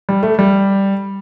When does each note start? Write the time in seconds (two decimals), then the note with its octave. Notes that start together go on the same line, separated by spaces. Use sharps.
0.09 G3
0.23 A3
0.39 G3